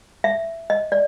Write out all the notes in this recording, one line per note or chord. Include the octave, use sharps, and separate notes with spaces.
E5
D#5
D5